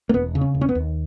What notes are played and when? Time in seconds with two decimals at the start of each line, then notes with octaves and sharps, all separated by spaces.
0.09 A#3
0.14 E1 B3
0.35 C#3
0.41 C#4
0.54 E1
0.61 C#4
0.69 B3
0.75 D#2